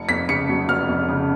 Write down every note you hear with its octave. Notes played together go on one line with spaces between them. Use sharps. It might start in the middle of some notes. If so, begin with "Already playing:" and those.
Already playing: F1 C#7
F2 B6
C#3 C#7
F#3
F1 F6
F2
C#3